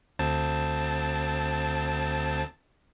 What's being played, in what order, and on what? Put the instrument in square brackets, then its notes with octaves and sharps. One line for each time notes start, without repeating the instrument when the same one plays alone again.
[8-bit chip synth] D2 C4 A5